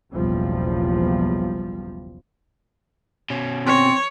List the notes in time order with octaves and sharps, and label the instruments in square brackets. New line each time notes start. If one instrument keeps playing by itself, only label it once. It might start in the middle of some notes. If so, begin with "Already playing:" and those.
[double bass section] F#1 B1 E2 F3 G3
[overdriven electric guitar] B2 C#4
[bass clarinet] C4 [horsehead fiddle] C#5